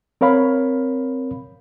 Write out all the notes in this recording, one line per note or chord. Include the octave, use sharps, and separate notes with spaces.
C4 A#4 C#5 F5 B5